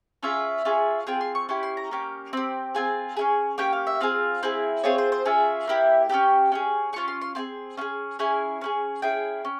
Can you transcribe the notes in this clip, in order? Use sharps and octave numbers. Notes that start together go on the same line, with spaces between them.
C#4 F4 G#4 E5
C#4 F4 G#4
C4 F4 G#4 G5
C6
C#6
C#4 E4 G4 C6
C6
A#5
A#3 C#4 G4
C4 G4
C4 F4 G#4 G#5
C#4 E4 G#4
A#3 C#4 G4 G5
F5
E5
C4 F4 G#4 F5
C4 E4 G#4
C4 F4 G#4 C#5
C5
C5
C#4 F4 G#4 E5
A#3 E4 G4
C#4 E4 G4 G5
C#4 E4 G#4
C#4 F4 G#4 C#6
C6
C6
C4 F4 G#4 C6
C#4 F4 G#4
C#4 E4 G#4 G#5
C#4 E4 G#4
C#4 E4 G#4 G5
C#4